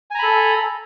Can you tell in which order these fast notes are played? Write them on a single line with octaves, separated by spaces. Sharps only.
G#5 A#5 B5 A4